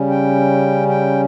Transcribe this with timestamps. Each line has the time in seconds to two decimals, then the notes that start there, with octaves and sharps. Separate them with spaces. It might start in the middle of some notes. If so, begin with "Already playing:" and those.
Already playing: C#3 G3 C#4
0.09 G5
0.88 G5